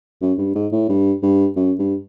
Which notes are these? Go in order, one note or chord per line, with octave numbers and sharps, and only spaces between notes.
F#2
G2
G#2
A2
G2
G2
F#2
G2